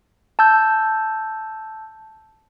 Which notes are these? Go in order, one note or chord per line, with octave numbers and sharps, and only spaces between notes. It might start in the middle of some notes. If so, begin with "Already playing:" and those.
A5 E6 G6